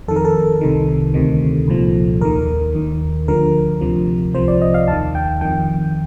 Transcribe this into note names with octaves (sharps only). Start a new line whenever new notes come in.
F2 D#3 A4
A#4
A4
C2 C3 D#3
D2 C3 D#3
C2 A#2 F3
D#2 D#3 A#4
D#2 D#3
D2 D3 F3 A#4
D2 C3 F3
C2 C3 F3 C5
D5
D#5
F5
D#2 D#3 A5
G5
F2 D#3 G5